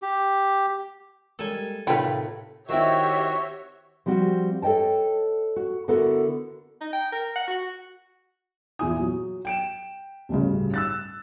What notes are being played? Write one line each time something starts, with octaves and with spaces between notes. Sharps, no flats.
G4
G3 G#3 A#3 A4 G#5
A2 C3 D#3 F4 B4 F#5 G5 B5
D#3 C4 E4 F#4 G4 C#5 E5
F3 G3 C4 F#4
A4 C#5 D#5 G5 A5
F#4
D3 B3 E4 F#4 A4 A#4
D#4
G5
A#4
F#5
F#4
E2 A#2 E4 G#5 D#6
F#3
G5 D7 E7
A1 D2 G2 C#3
E6 F#6 A6